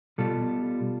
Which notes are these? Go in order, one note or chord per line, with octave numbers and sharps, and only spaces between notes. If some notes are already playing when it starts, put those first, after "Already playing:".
B2 G3 F4 A4